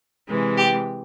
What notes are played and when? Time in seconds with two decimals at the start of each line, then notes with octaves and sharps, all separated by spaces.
0.27 C3 E3 G#3
0.56 G4